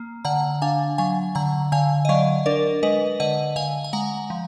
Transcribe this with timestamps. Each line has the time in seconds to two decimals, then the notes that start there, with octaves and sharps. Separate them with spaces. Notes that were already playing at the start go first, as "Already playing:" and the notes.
Already playing: A#3
0.25 D3 F#5 A#5
0.62 D4 F5 G#5
0.98 F#3 F5 G#5
1.35 D3 F#5 A#5
1.72 D3 F5 G#5
2.05 D#5
2.09 F#3 D5 F5
2.46 D4 A#4 D5
2.83 G#3 B4 D#5
3.20 D3 D#5 F#5
3.56 D3 F5 G#5
3.84 G#5
3.93 G#3 F#5 A#5
4.30 F3